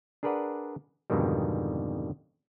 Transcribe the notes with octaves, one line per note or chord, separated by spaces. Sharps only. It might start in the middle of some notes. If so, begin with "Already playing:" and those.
D4 G#4 A#4 B4 D5 F#5
F2 G#2 B2 D3 D#3 G3